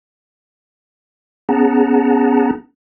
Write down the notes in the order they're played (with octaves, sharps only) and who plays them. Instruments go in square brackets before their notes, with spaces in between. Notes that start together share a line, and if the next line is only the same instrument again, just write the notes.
[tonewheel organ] B3 C#4 G#4 F#5 A5 A#5